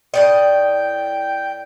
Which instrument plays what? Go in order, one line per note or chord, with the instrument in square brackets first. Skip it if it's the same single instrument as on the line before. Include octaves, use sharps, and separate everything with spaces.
[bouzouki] A2 D5 D#5 [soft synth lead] G5